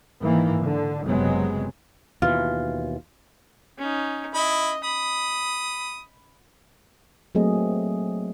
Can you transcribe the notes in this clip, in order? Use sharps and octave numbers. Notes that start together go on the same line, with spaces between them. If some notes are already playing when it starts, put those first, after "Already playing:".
G#2 D#3 E3 A#3
D3
F#1 C3 F#3 G#3 B3
D#2 B2 E3 F4
C#4 D#4
E4 D#5 B5
B5 D#6
F#3 A3 A#3 C4 G#4 D#5